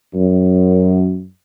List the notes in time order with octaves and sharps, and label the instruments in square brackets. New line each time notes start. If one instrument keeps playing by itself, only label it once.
[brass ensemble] F#2